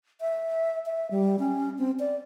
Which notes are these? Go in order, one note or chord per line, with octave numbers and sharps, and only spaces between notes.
E5
E5
G3
C#4
C4
D5